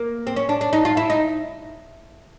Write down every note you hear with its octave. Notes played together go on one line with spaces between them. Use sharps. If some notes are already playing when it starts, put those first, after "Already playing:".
Already playing: A#3
C4
C#4
D4
D4
D#4
F4
E4
D#4